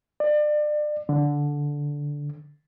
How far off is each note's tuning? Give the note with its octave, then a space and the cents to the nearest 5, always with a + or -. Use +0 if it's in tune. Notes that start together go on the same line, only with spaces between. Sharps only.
D5 +30
D3 -10